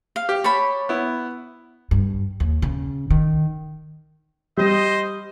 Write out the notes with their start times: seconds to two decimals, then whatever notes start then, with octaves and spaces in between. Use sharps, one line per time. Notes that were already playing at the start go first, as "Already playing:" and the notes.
0.16 F5
0.29 G4
0.44 C#5 A5 B5
0.89 B3 E4
1.91 G2
2.40 D#2
2.62 C#3
3.10 D#3
4.57 G3 C5 D#5